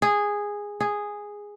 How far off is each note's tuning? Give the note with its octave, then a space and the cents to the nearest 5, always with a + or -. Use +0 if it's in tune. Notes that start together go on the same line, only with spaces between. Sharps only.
G#4 -10
G#4 -5